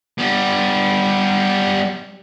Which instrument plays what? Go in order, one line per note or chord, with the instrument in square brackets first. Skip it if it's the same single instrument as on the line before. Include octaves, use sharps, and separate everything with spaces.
[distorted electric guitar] G3 B3